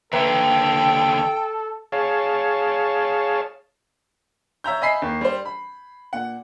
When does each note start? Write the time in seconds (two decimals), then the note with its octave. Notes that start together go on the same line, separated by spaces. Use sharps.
0.13 D#2 D3 A4 B4 E5 G5 A#5
1.92 G#4 C#5 F5 A5
4.64 C#5 E5 A#5 G6
4.82 D#5 E5 G#5 B5 B6 C7
5.02 D#2
5.21 G3 C5
5.45 B5
6.13 A#2 F#5